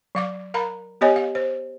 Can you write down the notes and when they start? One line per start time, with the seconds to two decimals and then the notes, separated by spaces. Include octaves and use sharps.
0.15 F#3 F5 D6
0.54 A#4 F5 A#5 B5
1.01 B3 G4 C#5 D#5 G#5
1.16 F5
1.35 C5